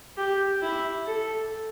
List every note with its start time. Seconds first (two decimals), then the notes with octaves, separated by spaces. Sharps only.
0.17 G4
0.62 E4
1.07 A4